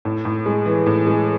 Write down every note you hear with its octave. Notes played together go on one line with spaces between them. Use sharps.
A2
A2
G#3
E3
A2
G#3